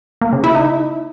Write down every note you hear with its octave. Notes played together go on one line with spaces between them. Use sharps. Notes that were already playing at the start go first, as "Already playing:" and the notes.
A#3
C#3
E4
D#4